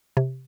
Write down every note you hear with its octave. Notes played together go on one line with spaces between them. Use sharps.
C3